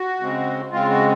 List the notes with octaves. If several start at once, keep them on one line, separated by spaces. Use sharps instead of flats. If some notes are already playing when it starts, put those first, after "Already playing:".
Already playing: F#4
C#3 G#3 C4
C#3 G#3 C4 F4
F#4